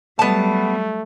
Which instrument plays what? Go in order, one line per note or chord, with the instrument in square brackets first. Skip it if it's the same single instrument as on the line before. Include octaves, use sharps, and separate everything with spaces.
[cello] F#3 G3 [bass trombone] A3 [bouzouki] B3 A5